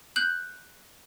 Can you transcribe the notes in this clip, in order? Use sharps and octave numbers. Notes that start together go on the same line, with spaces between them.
F#6 G6 F#7